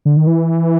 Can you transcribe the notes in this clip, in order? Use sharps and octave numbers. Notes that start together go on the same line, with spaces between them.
D3
D#3
E3